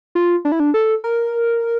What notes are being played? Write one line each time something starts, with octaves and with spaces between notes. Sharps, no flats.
F4
D4
E4
D4
A4
A#4